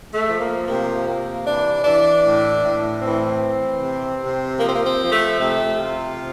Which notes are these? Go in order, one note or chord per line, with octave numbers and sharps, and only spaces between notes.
A3
F3
A#3
C3 A#3
C3 A#3
E3 D4
E3 D4
A2
A2
E3 C4
E3
C3
C3
F3 A#3
C4
A#3
C4
F3
A3
C3 A3
C3 F4
F3